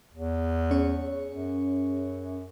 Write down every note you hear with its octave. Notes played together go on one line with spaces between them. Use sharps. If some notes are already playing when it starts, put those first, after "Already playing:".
E2
C#4 G#4 C#5
F#2